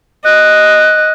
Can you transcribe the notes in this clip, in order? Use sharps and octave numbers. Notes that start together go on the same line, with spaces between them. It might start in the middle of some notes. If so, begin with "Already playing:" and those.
D#5 F#6